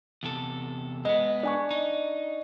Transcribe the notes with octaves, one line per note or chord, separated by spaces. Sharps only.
E2 C3 A4
G#3 B3 D#5
D4 G#5 C#6
D#4